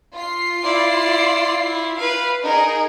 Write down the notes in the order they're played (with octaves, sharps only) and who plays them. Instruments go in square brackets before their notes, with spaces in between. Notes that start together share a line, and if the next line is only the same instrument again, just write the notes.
[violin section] F4 C7
[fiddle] E4 D5
E4
B4 F5
[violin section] D#4 G#4 [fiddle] A#4